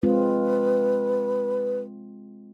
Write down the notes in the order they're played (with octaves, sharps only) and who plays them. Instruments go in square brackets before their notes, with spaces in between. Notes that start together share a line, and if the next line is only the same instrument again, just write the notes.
[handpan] G#3 C4 F4 [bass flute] B4